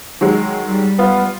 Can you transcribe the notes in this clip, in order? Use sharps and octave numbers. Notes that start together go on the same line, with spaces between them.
D#3 F#3 G#3
G3
B3 F4